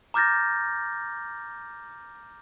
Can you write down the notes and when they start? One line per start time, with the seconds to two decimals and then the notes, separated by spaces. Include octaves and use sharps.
0.14 A#5 D6 F6 G6 A6 A#6